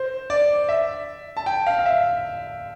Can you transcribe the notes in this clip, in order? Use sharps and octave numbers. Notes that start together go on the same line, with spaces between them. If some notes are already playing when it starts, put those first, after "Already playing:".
Already playing: C5
D5
E5
A5
G5
F5
F5
E5